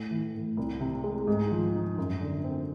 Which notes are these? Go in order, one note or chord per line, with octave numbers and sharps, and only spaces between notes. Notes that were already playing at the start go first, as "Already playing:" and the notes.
Already playing: A2
E3
A2
C2
C3
G#3
G#2
F3
D#4
F#2
D3
C4